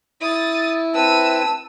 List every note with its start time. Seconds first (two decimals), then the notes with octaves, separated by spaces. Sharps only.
0.21 E4 D#6 A6
0.95 C4 B4 A5 E6 D#7